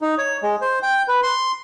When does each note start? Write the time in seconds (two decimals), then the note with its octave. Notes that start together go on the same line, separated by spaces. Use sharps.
0.01 D#4
0.18 C#5
0.43 G#3
0.61 C5
0.83 G5
1.08 B4
1.23 C6